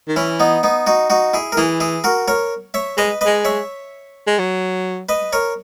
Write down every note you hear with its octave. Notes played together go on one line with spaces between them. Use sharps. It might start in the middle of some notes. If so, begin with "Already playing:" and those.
D#3
E3 C#4 E4
B3 D#4
B3 D#4
D#4 F#4
D#4 F#4
E4 G#4
A#4
E3 E4 G#4
E4 G#4
F#4 A#4
A#4 C#5
C#5 E5
G#3 B4 D#5
G#3 B4 D#5
C#5 E5
G#3
F#3
B4 D#5
A#4 C#5